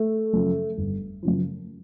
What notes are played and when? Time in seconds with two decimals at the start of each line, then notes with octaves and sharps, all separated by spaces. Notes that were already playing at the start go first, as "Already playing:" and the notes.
Already playing: A3
0.33 F#2 C#3 F3
0.77 G1
1.23 F#2 C#3 F3